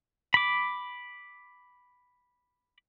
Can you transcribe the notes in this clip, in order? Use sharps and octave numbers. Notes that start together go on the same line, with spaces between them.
B5 D6